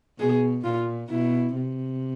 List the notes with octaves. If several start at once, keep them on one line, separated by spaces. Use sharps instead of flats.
B2 G#4
A#2 F4
B2 E4
C3